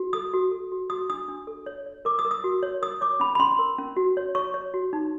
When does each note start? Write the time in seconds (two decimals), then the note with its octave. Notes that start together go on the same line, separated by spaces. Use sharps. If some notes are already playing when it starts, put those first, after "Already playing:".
Already playing: F#4
0.13 A4 D#6
0.33 F#4
0.52 A4
0.72 F#4
0.90 F#4 D#6
1.10 D4 D#6
1.28 D4
1.47 A4
1.66 C#5
1.86 C#5
2.05 A#4 D6
2.19 D#6
2.25 A#4
2.31 D#6
2.44 F#4
2.63 C#5
2.82 A#4 D#6
3.01 C#5 D6
3.20 C#4 B5
3.35 B5
3.40 C#4 C6
3.59 A#4
3.78 C#4
3.97 F#4
4.17 C#5
4.35 C#5 C#6
4.54 C#5
4.74 F#4
4.93 D#4